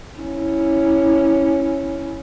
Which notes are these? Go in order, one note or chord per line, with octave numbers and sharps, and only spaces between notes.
C#4 E4